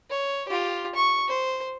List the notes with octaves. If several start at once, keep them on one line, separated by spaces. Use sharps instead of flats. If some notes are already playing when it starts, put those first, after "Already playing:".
C#5
F4 G4
C#6
C5